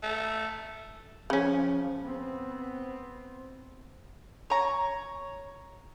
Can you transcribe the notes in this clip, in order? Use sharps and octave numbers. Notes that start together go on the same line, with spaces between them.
A3
C#3 F3 C#4
B3 C4
C#5 A#5